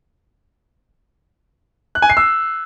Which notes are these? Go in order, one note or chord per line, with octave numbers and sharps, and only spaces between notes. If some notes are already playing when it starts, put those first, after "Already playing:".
F#6
G#5
C7
E6